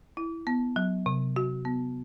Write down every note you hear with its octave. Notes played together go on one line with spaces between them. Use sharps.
E4
B3
F#3
C3
F#4
B3